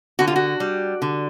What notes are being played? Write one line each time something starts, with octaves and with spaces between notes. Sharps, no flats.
D3 F#4
F4
F#4
G3
D3